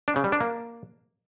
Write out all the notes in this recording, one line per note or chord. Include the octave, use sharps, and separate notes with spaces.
D4
C#3
G3
D4
A#3